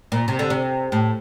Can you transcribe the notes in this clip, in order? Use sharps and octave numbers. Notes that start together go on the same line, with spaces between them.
A#2
C3
D3
C3
A2